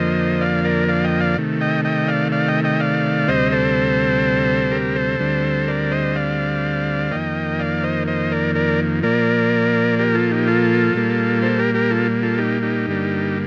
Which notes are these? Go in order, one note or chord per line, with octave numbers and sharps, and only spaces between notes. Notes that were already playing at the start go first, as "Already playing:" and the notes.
Already playing: F2 D3 F3 A#3 C5 D#5
D5 F5
A#4 D5
D5 F5
D#5 G5
D5 F5
C3 D#3 A3
D#5 G5
D#5 G5
D5 F5
D5 F5
D#5 G5
D#5 G5
D5 F5
D2 C3 G3 C4 C5 D#5
A4 C5
G4 A#4
A4 C5
D2 D3 G3 C4
A#4 D5
C5 D#5
D5 F5
F2 D#3 A#3 D#5 G5
D5 F5
C5 D#5
C5 D#5
A#4 D5
A#4 D5
A#2 F3 A#3 A#4 D5
G4 A#4
F4 A4
D#4 G4
F4 A4
A#2 G3 A#3
A4 C5
G4 A#4
G4 A#4
F4 A4
F4 A4
D#4 G4
D#4 G4
G2 D3 G3 A#3